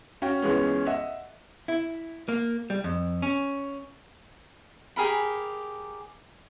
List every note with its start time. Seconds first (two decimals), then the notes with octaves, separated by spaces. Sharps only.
0.22 C#4 F#4 F5 G5
0.42 C#2 E3 G#3 B3 C#4
0.86 D#5 E5 F#5
1.68 E4
2.28 A#3
2.70 G3
2.84 F2
3.22 C#4
4.96 G4 G#4 A#4 B5